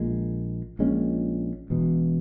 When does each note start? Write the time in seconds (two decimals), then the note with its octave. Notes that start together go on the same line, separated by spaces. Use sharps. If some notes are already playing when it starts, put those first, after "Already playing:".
Already playing: A#1 A#2 G#3
0.79 A#1 A#2 G#3 C#4
1.70 E1 E2 B2